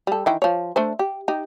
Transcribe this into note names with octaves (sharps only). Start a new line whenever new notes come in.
G3 A4
D#3 E3 G5
F3 C#5
A3 D4 C5
G4
D#4 G4